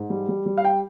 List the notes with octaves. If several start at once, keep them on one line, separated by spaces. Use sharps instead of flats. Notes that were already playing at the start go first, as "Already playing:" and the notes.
Already playing: G#2
G3
G3
G3
F5
G5